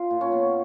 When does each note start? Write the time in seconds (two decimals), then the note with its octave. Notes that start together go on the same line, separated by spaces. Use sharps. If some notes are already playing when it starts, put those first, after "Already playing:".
Already playing: F4
0.11 A#2
0.21 C#4
0.32 B3